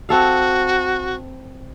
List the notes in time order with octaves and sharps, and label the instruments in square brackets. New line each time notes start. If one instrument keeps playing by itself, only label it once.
[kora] C4 A4 F5 [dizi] F#4